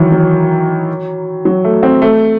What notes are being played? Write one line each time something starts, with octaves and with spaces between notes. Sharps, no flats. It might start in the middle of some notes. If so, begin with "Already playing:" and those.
Already playing: D#3 E3 F#3
F#3
F#3
A3
C4
A3